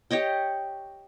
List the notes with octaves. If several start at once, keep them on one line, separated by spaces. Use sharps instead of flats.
G4 C#5 D#5 G5